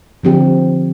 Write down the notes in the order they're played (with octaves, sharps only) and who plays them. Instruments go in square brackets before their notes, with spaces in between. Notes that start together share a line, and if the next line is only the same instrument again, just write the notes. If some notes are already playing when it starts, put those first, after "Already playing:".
[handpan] D3 F3 C4 G4